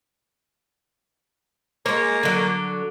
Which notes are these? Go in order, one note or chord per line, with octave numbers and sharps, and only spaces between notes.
G#3 A#3 C#5
D3 F#3